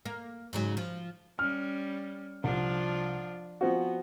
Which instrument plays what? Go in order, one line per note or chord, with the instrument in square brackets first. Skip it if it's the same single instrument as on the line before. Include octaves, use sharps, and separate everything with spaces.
[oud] A#3
G#2 C#3 F#3
F3
[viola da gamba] G3 C#4 [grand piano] F6
[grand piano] C2 [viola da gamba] F3 D4 F4
[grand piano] F3 C4 F#4 [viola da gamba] B3